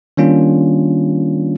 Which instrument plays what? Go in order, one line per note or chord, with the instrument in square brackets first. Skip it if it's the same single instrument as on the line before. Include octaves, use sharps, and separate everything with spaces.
[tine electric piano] D#3 G3 A#3 C#4 D4 F4